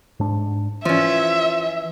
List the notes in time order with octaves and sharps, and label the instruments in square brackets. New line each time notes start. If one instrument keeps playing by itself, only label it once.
[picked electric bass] G#2 D4
[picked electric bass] E3 [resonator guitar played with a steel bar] F3 C#4 [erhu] E5